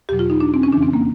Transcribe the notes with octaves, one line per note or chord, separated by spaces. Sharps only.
E2 B2 F#3 G4
F4
D#4
D4
C4
C#4
F2 C#3 E3 D4
C4
A#3